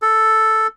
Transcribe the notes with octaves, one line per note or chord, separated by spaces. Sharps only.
A4